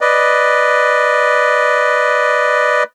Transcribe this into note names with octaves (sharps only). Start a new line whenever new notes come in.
B4 D5 D#5